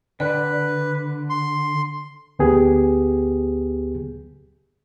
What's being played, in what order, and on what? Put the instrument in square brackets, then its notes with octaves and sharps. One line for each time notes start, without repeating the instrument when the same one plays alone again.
[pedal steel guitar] D3 [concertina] B4 [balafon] D5
[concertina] C6
[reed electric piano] D2 B3 G4 G#4